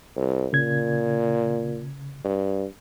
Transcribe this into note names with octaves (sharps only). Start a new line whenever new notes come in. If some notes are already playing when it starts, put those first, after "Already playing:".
C2
A#2 C#3 G#6
G2